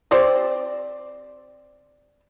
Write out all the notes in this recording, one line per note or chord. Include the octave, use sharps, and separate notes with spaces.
C4 G4 C5 D5